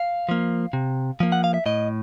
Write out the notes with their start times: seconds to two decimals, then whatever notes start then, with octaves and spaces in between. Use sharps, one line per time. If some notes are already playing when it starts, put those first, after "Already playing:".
Already playing: F5
0.29 F3 A#3
0.73 C3
1.20 F3 A#3
1.32 F#5
1.44 F5
1.54 E5
1.66 A2 D#5